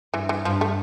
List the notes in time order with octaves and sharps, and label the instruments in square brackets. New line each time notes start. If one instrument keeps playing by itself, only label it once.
[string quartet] G2 [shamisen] E3
[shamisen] E3
[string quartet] G2 [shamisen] F3
[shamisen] A3